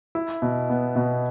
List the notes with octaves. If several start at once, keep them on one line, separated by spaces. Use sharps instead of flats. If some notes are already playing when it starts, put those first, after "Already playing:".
E4
B2
B3
B2